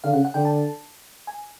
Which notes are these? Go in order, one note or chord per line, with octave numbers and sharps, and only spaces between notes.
D3 F5
C#3 F#5
F#5
D3 G5
A5
G#5